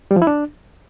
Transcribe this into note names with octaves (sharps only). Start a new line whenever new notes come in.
G3
F3
E4
D4